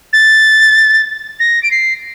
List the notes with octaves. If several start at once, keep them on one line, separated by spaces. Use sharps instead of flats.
A6
A#6
D7
C7